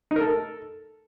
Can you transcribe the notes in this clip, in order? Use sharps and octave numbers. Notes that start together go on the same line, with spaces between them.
D#4
A#4
A4